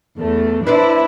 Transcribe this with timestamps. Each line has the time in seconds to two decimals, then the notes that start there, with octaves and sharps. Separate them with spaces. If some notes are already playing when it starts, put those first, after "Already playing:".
0.19 E2 A3
0.67 D4 E4 B4 C5 D5